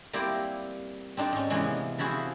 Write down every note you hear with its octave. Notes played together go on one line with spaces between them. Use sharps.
G3 A#3 C4 E4 G4
C4 D4 D#4 A4
G#2 C#4
C3 E3 G#3 A#3 B3 C#4
E3 F3 E4 F#4 G#4 C5